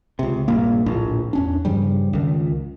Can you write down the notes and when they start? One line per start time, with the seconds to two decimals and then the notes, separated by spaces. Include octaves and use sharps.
0.19 C#2 C3
0.48 A#1 G2 A#3
0.86 D1 A#1 A2 D4
1.33 E2 C#4 D4
1.65 G2 C#3 F3 G3
2.13 C#2 D#3